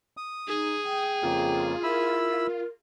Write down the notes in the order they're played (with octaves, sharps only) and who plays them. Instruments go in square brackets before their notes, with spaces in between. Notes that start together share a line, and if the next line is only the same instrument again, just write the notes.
[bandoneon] D#6
[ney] D#4 [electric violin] G#4
[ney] G5
[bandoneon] F2 C#3 A#3 [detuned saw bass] F4
[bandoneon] E4 B5 E6 [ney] A#4